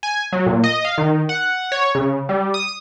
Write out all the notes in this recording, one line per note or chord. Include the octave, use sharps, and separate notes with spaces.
G#5
F#3
A#2
D#5
F5
D#3
F#5
C#5
C#3
G3
D#6